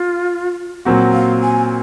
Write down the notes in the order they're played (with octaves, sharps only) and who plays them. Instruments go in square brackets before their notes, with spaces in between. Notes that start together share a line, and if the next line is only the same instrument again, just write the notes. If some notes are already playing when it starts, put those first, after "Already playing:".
Already playing: [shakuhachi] F4
[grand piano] A#2 F#3 C4 F#4
[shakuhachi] F5
G#5